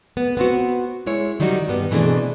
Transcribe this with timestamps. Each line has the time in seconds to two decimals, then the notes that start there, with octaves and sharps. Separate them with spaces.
0.17 B3
0.37 B3 C4 F#4
1.06 G#3 E4 C#5
1.40 D#3 F#3 G3 D#4 F#4
1.68 G2 G3 B3
1.91 B2 E3 A3 C4 D4 G#4